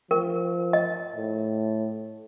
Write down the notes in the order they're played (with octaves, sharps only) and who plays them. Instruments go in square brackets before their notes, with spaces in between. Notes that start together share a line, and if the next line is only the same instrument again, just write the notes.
[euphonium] F3 [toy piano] A#4
[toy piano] D#5
[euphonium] A2